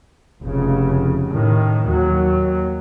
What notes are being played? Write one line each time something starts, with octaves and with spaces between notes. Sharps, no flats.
F1 C#3
A2 D#3
D#2 F#3